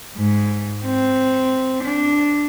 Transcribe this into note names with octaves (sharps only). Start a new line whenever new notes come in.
G#2
C4
D4